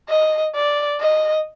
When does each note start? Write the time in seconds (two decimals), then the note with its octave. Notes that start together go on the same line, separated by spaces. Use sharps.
0.09 D#5
0.55 D5
1.00 D#5